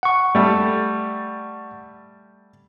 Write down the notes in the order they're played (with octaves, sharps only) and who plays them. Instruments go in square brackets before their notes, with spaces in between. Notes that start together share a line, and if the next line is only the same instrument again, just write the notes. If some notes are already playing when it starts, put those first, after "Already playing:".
[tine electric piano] F#5 C#6
[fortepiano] G3 A3